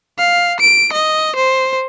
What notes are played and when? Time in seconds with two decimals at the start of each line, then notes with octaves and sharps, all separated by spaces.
0.19 F5
0.60 D7
0.93 D#5
1.36 C5